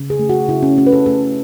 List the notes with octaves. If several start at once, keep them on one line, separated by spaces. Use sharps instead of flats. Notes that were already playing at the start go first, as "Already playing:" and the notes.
Already playing: C#3
G#4
A3
F#4
C#3 E4
C#4
A3 C#4
B4
A4
A3 A4